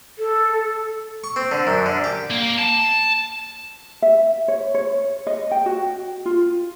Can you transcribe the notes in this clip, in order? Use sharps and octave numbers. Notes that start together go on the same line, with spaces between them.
A4
C#6
C4
D3
F#2
D3
G4
A#3
A5
E5
C#5
C#5
D#5
G5
F#4
F4